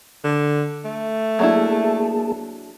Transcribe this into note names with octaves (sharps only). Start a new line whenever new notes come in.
D3
A3
F#3 A#3 D4 E4 G#4 A5